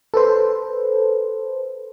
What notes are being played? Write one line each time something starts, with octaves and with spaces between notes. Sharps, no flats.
A4 B4 C5